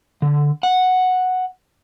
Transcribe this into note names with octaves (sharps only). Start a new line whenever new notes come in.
D3
F#5